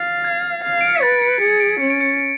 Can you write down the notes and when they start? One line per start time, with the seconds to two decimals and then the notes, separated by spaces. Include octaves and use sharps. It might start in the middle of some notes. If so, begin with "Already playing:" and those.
Already playing: F5 A6
0.24 G#6
0.64 F5
0.81 D7
0.88 C#7
0.95 B6
1.02 B4 A6
1.22 C#7
1.34 B6
1.41 G#4 C#7
1.60 D7
1.80 C#4 C#7
1.90 D7
2.01 C#7